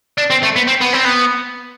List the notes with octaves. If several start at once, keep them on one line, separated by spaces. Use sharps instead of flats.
D4
C4
A3
B3
C4
B3
C4
B3